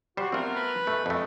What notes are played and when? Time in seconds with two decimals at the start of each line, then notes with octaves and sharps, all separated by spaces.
0.17 G3 F#4 C5
0.32 A3 B3 C4 F4 A#4
0.56 B4
0.87 F#2 A3
1.06 F2 G#3 A3